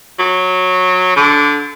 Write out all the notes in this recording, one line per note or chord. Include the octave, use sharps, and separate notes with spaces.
F#3
D3